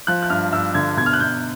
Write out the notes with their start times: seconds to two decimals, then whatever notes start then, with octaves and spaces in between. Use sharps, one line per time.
0.07 F3 F#6
0.23 F#6
0.30 G2 F6
0.52 G2 E6
0.75 D3 G#6
0.97 B2 G#6
1.06 F6
1.13 F#6
1.20 B2 G6